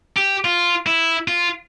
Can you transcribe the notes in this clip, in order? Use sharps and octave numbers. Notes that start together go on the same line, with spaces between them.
G4
F4
E4
F4